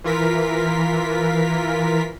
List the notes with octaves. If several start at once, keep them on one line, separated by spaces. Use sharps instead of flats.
E3 F4 A#4 B6